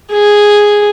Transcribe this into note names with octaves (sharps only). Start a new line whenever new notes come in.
G#4